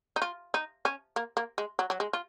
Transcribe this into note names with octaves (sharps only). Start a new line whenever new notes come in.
D#4
F4
D#4
C#4
A#3
A#3
G#3
F#3
F#3
G#3
F4